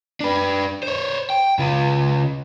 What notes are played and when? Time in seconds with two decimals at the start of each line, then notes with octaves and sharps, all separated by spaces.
0.20 D4 B4
0.83 C5 C#5
1.30 G5
1.59 C#3 F4